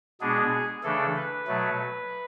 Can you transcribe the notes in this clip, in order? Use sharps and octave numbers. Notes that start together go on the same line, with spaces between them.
B2 G#3 B3 D4 G#4
C#3 E3 A3 D4 A4
B4
B2 F#3 A3